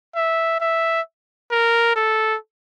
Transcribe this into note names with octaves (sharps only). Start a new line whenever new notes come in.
E5
E5
A#4
A4